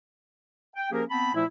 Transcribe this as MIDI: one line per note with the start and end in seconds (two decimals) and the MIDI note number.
0.76 0.87 79
0.92 1.03 53
0.92 1.03 58
0.92 1.03 61
0.92 1.03 67
0.92 1.03 68
0.92 1.03 70
1.10 1.32 59
1.10 1.32 60
1.10 1.32 81
1.10 1.32 83
1.34 1.44 46
1.34 1.44 53
1.34 1.44 57
1.34 1.44 64